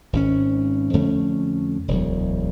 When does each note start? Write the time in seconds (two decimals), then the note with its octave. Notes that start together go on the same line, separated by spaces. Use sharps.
0.13 G#1 C3 C#4
0.93 F2 D3 A3 C#4
1.88 E1 D2 F#3